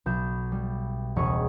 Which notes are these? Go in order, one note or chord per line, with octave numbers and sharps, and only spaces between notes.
B1 G6 E7
G3
E1 C#2 G#4 C#5 C#6